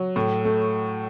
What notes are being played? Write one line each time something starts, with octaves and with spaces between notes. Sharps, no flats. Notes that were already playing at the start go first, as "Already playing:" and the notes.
Already playing: F#3
A2
A3